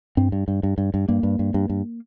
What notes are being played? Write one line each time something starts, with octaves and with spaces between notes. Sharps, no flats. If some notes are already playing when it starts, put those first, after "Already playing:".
G2 C4
G2
G2
G2
G2
G2
G2 A#3
G2
G2
G2
G2